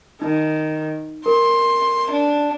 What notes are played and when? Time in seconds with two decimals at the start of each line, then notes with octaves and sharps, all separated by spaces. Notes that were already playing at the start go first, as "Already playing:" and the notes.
0.22 D#3 D#4
1.26 A#4 C6
2.11 D4